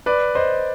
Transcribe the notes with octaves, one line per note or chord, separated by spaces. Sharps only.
B4 D5
C5 D#5